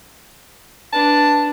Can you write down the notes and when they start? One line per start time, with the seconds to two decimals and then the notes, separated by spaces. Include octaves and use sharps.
0.93 D4 B4 A5